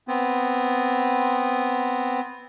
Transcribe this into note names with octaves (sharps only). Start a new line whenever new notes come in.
B3 C4